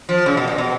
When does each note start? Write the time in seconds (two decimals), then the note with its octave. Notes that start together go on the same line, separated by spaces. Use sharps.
0.09 F3
0.26 C#3
0.37 B2
0.48 A#2
0.58 B2